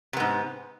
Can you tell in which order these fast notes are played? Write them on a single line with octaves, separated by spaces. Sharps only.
C3 B3 G#2